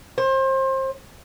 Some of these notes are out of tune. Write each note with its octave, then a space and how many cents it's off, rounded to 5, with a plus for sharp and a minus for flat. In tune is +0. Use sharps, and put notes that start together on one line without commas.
C5 +30